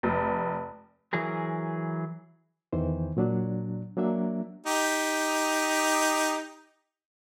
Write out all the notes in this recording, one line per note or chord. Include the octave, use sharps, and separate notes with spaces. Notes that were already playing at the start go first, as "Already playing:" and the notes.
F1
E3 F#3 G#4 A#4
E2 D#3 E3 C5
A#2 F#3 D4
F#3 A#3 D4 E5
D#4 G4